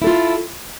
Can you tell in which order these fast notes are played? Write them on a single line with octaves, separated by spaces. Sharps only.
E4 A4 F4